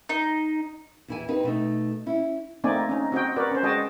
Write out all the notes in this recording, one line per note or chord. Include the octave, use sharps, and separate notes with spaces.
D#4
E2 E4 G#5
C4 D#4 G4 B4
B2 A3 D#4
C#4 E4
A3 A#3 C4 D#4 D5 G#5
C#4 D#4
C4 F#4 D#5 G5
F#4 A#4 B4 D5
C#4 C5
G#3 F#4 D#5 G5 A5